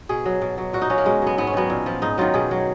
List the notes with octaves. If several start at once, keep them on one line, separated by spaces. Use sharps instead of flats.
B2 G#4
F#3
B2
F#3
A#2 F#4
D#4
F#3 C#4
A#3
B2 G#3
F#3 B3
G#2 B3
C#4
D#3 F#3 B3
A#2
F3
G#2 D#4
D#3 F#3 F4
B2 G#4
F#3